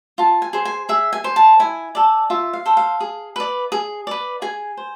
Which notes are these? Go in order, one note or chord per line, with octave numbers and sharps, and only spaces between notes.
F4 A5
G#5
G#4 C5
G#5
G#4 E5
G#5
C5
A5
E4 G#5
A4 D5
F4 E5
F5
A4 C5
F5
G#4
B4 D5
G#4
B4 D5
G#4 G#5
C5